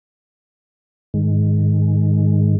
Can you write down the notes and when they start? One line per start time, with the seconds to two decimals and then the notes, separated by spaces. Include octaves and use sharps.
1.14 G#2 D#3 G#3